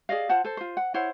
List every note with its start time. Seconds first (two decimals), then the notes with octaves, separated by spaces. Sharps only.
0.09 G#4 D5 D#5 F5
0.29 F4 C5 F#5 A5
0.44 A4 C5
0.57 F4 C5
0.77 F#5
0.94 E4 C5 C#5 F#5